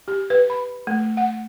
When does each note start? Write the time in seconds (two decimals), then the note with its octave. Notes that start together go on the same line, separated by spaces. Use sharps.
0.08 G4
0.30 B4
0.50 B5
0.87 A3
1.17 F#5